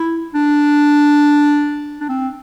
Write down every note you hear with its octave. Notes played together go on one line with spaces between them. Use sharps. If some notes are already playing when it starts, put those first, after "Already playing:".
Already playing: E4
D4
D4
C4